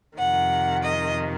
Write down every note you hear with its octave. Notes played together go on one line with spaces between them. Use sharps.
F2 C3 D#3 F#5
D#5